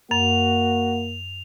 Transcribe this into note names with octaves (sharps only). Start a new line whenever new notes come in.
F#2 A#3 F#4 F7